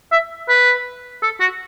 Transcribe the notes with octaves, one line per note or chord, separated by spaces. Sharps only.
E5
B4
A4
F#4